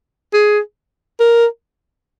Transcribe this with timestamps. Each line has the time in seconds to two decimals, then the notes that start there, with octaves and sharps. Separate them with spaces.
0.33 G#4
1.20 A#4